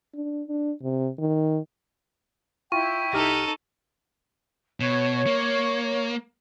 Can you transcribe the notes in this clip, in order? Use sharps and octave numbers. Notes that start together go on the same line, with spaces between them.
D4
D4
C3
D#3
E4 F4 G5 C#6
C2 D#4 G4 A4 F6
B2 C#5
A#3